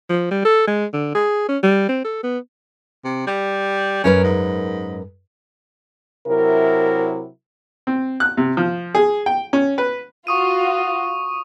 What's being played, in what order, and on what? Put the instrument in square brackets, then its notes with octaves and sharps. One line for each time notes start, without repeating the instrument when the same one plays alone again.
[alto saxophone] F3
G3
A4
G#3
D3
G#4
C#4
G3
C4
A4
B3
[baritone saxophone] C3
G3
[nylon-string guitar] F#2 A#4 B4 [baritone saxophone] C#4
[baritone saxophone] G#2
[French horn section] C3 F#3 E4 A#4
[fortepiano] C4
F#6
C3
F3
G#4
G5
C#4
B4
[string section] F4 F#4 [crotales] C#6 D#6 D#7